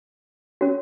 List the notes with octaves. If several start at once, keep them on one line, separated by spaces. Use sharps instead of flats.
C#4 F#4 C#5